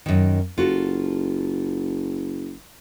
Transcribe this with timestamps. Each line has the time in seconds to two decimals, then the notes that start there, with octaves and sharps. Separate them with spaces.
0.06 F#2 D#3
0.58 F#1 F4 F#4 A4